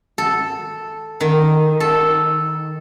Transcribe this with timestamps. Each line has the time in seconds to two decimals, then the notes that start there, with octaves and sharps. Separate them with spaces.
0.18 A4
1.21 D#3
1.80 A4